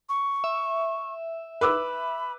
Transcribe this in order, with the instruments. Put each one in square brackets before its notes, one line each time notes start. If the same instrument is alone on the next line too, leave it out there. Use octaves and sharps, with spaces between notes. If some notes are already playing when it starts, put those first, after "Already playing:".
[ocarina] C#6
[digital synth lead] E5
[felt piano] B4 D6 E6 [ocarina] B5